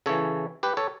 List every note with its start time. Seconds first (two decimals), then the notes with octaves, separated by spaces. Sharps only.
0.06 C#3 E3 A4 C#5
0.63 G4 B4
0.77 A4 C#5